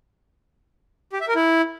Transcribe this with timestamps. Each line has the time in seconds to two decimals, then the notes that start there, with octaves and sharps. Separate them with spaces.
1.13 G4
1.20 E5
1.28 A#4
1.36 E4